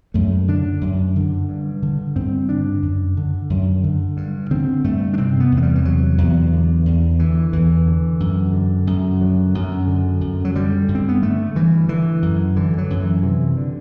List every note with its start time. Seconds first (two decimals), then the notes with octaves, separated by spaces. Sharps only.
0.14 F#2 A3
0.48 D3 D4
0.81 F#2
1.16 D3
1.49 G2
1.82 D3
2.16 G2 C4
2.49 D3 D4
2.82 F#2
3.17 D3
3.50 F#2
3.83 D3
4.17 G2
4.51 D3 C4
4.84 G2 A3
5.13 D4
5.18 C3 C4
5.40 B3
5.52 E2
5.57 A3
5.63 G3
5.75 E3
5.85 C3 F#3
6.18 E2
6.53 D3
6.86 E2
7.19 D3 E3
7.53 E2 E3
7.87 D3
8.20 F#2
8.53 D3
8.87 F#2
9.21 D3 F#3
9.55 F#2
9.87 D3
10.21 F#2
10.45 F#3
10.55 D3 G3
10.88 G2
10.95 C4
11.09 B3
11.22 D3 A3
11.55 G2 E3
11.88 D3 E3
12.22 F#2
12.56 D3 E3
12.78 F#3
12.90 F#2
13.01 E3
13.23 C3 E3
13.57 D3